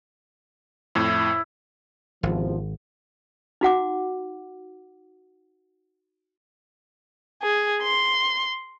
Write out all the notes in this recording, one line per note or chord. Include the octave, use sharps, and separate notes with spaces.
F2 A2 E4
G#1 E2 C3 F3
D#4 F#4 F#5 D6
G#4
C6